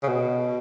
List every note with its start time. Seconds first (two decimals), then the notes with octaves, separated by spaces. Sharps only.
0.03 C#3
0.08 B2